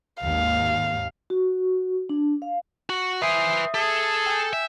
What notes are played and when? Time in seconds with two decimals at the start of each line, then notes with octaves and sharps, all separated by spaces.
0.21 G#1 D#2 F5
1.30 F#4
2.09 D4
2.42 F5
2.90 F#4
3.22 B4 C5 E5 G#5 D#6
3.74 G#4 A4
4.26 G5 G#5 G6
4.53 E5